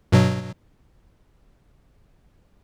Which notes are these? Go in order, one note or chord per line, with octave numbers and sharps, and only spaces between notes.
G2 B2 F#3